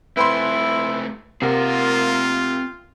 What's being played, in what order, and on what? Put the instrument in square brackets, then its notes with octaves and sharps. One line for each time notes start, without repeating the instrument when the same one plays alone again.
[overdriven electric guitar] A3 C4 [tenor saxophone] E4 [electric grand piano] B4 B5 C6
[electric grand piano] C3 A#4 [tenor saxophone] A#3 [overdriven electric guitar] C4 F#5 [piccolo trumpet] F4